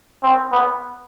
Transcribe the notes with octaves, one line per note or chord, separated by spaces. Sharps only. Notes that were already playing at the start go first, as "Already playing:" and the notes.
C4
B3